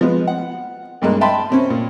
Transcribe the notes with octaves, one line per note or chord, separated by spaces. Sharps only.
F3 G#3 B3
F#5
B1 G2 G#3 A#3
E5 G5 A5 B5 C6
C3 C4 C#4
A#2